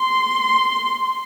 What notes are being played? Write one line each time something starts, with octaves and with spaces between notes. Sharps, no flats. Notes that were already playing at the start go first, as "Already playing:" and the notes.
Already playing: C6